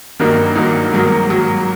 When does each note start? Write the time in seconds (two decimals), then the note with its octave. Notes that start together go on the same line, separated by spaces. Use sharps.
0.20 G2 D#3 F#3 A#3 D#4
0.55 G2 D#3 F#3 A#3 D#4
0.92 G#2 D#3 F#3 A#3
1.29 D#3 F#3